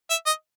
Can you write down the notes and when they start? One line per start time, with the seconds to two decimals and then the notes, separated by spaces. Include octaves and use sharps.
0.10 E5
0.26 D#5